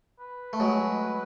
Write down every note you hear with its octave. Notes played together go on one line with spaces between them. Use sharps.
B4
A3
F#3 G#3